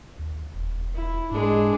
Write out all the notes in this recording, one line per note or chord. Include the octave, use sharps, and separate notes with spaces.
D#2
E1
E4
G#2 G#3 D4